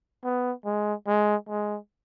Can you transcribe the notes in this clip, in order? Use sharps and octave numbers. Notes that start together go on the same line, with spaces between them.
B3
G#3
G#3
G#3